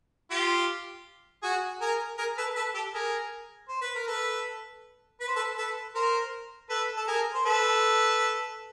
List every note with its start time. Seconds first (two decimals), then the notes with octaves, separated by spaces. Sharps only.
0.30 F4 G4
1.43 F#4 G#4
1.81 G#4 A#4
2.18 G#4 A#4
2.38 A4 B4
2.56 A4 B4
2.74 G4 A4
2.94 G#4 A#4
3.69 C5
3.81 B4
3.95 A#4
4.07 A4 B4
5.20 B4
5.28 C5
5.36 A4 B4
5.57 A4 B4
5.95 A#4 C5
6.70 A4 B4
6.97 A4
7.08 G#4 A#4
7.34 C5
7.46 A4 B4